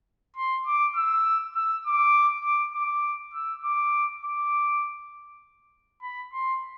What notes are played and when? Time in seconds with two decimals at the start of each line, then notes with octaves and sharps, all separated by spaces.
0.37 C6
0.67 D6
0.96 E6
1.56 E6
1.86 D6
2.45 D6
2.75 D6
3.34 E6
3.64 D6
4.24 D6
6.02 B5
6.33 C6